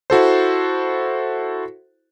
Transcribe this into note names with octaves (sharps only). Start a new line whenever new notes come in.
E4 F#4 A4 C5